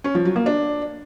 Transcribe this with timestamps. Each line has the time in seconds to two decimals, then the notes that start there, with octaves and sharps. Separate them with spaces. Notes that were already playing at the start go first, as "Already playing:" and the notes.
0.04 C#4
0.15 F3
0.25 F#3
0.36 A#3
0.46 D4